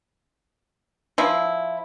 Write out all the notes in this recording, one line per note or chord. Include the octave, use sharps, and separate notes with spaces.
F3 E4